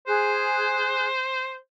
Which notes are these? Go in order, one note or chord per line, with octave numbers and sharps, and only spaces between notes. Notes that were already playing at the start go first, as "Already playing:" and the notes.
G#4 C5 F#6